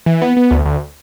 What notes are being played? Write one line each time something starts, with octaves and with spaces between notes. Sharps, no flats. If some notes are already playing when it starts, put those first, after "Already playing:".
E3
B3
B3
D2
D2